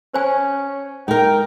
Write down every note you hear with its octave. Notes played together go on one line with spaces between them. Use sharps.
C#4 C5 G#5
G#3 D#4 A#4 G5